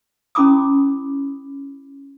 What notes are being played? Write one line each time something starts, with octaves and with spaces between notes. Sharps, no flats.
C#4 E4 B5 D6 D#6